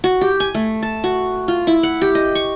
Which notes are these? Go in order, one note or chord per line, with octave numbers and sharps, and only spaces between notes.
F#4
G4
G#5
A3
A5
F#4
F4
E4
F#5
G4
D#5
C#6